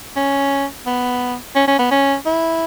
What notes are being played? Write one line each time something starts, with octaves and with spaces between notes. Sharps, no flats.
C#4
B3
C#4
C#4
B3
C#4
E4